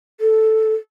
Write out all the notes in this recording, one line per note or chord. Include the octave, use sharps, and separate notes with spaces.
A4